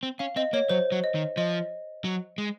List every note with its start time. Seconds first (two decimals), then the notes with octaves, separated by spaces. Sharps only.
0.03 C4
0.19 C#4 F5
0.36 C4 D#5
0.53 A#3 C#5
0.69 F#3 C5
0.92 F#3
1.04 D#5
1.15 D#3
1.37 F3 D#5
2.04 F#3
2.38 G#3